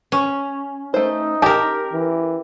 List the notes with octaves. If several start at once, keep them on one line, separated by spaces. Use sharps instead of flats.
C#4
A3 D#4 C5
G4 A#4 A5
E3